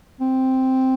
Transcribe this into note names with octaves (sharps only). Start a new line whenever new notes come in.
C4